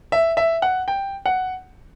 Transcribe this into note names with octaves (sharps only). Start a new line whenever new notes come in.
E5
E5
F#5
G5
F#5